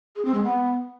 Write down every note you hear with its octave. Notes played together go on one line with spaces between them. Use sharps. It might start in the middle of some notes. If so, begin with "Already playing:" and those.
G#4
C4
G#3
B3